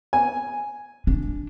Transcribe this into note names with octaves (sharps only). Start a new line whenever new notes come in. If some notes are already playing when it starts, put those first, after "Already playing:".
G#5
D4